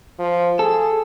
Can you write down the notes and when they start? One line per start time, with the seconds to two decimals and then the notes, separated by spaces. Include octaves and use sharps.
0.19 F3
0.59 G#4 A4